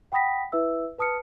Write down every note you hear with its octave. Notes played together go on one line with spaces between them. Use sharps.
F#5 G5 B5 D#6 A#6 B6
E4 B4 E5 E6
B4 A5 D#6 F6 C#7